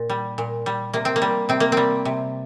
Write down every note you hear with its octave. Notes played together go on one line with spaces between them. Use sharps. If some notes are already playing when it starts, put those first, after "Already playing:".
Already playing: A#2
G3
A#2
G3
C3 A#3
C4
A#3
G3
C3 C4
A#3
G3 C4
C3